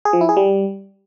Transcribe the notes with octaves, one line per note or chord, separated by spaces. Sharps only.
G#4
F3
E4
G#4
G3